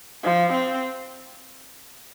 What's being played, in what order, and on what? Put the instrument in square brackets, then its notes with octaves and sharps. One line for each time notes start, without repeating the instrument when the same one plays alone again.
[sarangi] F3
C4